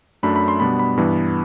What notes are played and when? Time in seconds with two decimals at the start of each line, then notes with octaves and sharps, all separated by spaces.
0.23 F#2 F#3 A3 D4 B5
0.36 B5
0.48 C6
0.60 B2 G3 B3 D4 B5
0.79 B5
0.97 G2 E3 B3